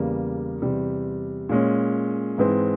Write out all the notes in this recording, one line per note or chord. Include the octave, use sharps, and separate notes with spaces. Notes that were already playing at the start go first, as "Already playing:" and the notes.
Already playing: E2 C#3 G3 A#3
E2 C3 G3
A#2 G#3 C#4
G#2 E3 G#3 C4